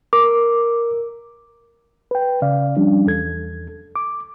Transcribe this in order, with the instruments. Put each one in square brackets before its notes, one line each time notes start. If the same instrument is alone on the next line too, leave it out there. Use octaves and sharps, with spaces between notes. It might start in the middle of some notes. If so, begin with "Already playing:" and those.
[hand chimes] A#4 [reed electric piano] D6
[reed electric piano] B4 G5
C#3 D5 F5
F3 G3 C#4 D4
E2 A4 G#6
D6